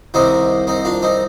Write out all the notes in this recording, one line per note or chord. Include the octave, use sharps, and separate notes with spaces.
C2 C3 D#3 C4 D#4
C4 D#4
D4 F4
C4 D#4